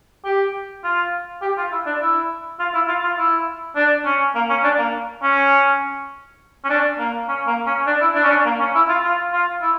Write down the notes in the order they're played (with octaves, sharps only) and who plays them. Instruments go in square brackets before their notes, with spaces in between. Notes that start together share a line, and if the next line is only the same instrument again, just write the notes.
[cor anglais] G4
F4
G4
F4
E4
D4
E4
F4
E4
F4
F4
E4
D4
C#4
A#3
C#4
D4
A#3
C#4
C#4
D4
A#3
C#4
A#3
C#4
D4
E4
D4
C#4
D4
A#3
C#4
E4
F4
F4
F4
E4